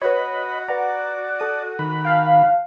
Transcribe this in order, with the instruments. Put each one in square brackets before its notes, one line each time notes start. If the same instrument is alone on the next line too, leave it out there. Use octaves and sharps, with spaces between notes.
[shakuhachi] F#4 [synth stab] B4 C#5 [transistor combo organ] D#5 B5
[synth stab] B4 F#5 A#5 [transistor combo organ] D5
[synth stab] A4 D#6
[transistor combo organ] D#3 B5
[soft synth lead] F5 [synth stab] G5 A5